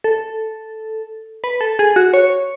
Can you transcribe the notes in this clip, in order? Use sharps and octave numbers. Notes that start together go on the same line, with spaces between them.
A4
B4
A4
G#4
F#4
C#5